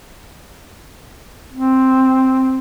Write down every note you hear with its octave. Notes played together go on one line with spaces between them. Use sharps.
C4